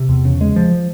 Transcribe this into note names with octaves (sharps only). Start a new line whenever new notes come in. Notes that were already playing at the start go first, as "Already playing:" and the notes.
Already playing: C3
E2
C#3
G#3
F3